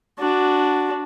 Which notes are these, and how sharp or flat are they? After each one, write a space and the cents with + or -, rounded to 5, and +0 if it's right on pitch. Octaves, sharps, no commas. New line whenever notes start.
D4 +0 F#4 +0